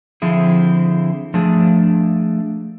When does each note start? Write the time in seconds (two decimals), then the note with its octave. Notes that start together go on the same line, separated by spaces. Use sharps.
0.22 D3 F3 C4 E4 G#4
1.34 F3 A3 D4 G#4